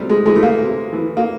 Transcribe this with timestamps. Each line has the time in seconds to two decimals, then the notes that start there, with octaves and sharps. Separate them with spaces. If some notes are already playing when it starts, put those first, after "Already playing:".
Already playing: C3 G3
0.09 G#3
0.26 E3 G#3
0.35 A3
0.43 A#3
0.58 C3
0.93 E3
1.17 A#3